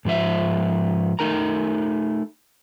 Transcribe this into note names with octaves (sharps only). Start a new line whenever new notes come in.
G#2 F3 C5 E5
A3 D#4 A#4 A#5